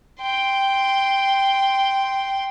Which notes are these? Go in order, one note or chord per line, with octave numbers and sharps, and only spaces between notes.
G5 C6